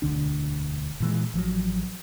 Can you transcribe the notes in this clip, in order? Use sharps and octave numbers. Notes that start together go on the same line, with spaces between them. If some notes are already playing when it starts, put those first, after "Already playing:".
E1 D2 D3 D4
A#2 E3 G#3
A1 F3 F#3